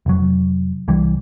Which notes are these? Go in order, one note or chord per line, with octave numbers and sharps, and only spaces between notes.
F1 F#3
C2 E3 G3